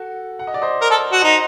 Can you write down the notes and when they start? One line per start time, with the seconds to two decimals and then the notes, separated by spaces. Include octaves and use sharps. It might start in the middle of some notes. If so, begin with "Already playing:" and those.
Already playing: F#4 A4
0.39 F#5
0.47 D#5
0.54 D5
0.62 C5 D#5
0.81 A#4
0.91 A4
1.12 F#4
1.22 D#4 C5 D#5